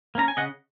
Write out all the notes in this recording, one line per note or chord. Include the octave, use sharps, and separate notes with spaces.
A#3 C#4 A#5
G#5
C#3 D#5 F#5